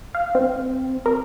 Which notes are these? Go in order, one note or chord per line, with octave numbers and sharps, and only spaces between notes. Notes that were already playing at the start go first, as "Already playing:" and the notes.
F5
C4
A#4